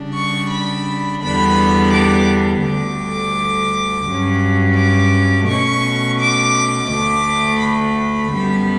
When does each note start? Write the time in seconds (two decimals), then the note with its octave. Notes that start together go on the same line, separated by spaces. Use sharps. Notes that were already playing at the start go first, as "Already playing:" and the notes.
Already playing: C#3 G3 D4
0.16 C#6
0.52 B5
1.23 E2 D3 G3 B3 D4 B5
1.93 D6
2.65 D2 D3 G3 D6
4.07 G2 F#3 C#4
4.78 D6
5.49 B2 A3 C#4 C#6
6.20 D6
6.92 D2 D3 A3 D6
7.62 B5
8.33 F#2 D3 G3 B3